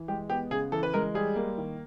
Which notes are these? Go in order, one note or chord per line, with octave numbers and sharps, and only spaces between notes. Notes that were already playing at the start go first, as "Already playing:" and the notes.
Already playing: E3
G#3 G4
B3 G4
C#3 G#4
E3 A4
B4
G#3 A#4
G3 G#4
A#3
D#3